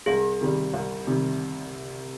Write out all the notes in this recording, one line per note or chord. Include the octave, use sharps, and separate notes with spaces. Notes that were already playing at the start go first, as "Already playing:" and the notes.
C2 G#4
C3 D#3 G3
C2
C3 D#3 G3